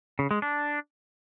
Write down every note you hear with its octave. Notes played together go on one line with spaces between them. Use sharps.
C#3
G#3
D4